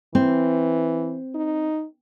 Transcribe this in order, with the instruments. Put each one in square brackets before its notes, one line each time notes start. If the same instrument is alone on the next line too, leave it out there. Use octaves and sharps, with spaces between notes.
[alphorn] E3 [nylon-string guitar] C4
[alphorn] D#4